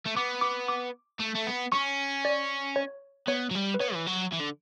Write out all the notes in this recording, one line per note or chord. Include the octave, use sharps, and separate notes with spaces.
A3
B3 D6
D6
D6
A3
A3
B3
C#4 C#6
D5
C#5
B3 C#5
F#3
G3
B4
B3 C#5
E3
F#3
E3
D3